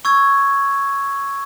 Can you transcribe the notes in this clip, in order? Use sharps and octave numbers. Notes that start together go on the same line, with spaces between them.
C#6 E6 G#6